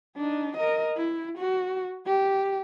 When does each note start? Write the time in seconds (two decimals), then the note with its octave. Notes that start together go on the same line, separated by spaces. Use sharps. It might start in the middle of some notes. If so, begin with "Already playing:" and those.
0.16 D4 D#4
0.57 A#4 D#5
0.96 E4
1.38 F#4
2.06 G4